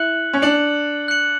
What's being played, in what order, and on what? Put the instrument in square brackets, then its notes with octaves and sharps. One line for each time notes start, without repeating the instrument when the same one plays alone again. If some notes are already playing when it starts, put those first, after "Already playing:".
Already playing: [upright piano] E4 [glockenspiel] F#6 C#7 F#7
[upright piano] C#4
[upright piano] D4 [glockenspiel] F#6 C#7 F#7
[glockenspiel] F#6 C#7 F#7